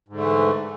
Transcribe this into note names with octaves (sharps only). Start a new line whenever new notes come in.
G#2 D3 E3 A3